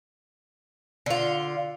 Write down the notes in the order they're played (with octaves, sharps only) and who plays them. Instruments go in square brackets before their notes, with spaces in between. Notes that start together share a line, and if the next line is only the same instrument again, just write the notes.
[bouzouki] D3 F4